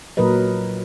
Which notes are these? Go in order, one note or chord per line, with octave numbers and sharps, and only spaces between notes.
A#2 F#3 A#4 B4 D#5